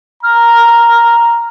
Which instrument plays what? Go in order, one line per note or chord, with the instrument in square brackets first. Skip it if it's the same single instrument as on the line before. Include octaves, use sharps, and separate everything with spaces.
[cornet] A#5 [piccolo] F6